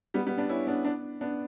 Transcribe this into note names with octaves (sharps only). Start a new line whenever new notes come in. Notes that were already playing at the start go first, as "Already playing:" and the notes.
G3 B3
G3 B3
B3 D4
C#4 E4
B3 D4
B3 D4
B3 D4